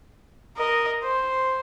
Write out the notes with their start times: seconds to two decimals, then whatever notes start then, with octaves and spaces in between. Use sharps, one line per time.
0.57 A#4 D#5
1.03 C5